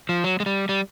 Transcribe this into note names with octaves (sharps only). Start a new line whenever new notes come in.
F3
F#3
G#3
G3
G3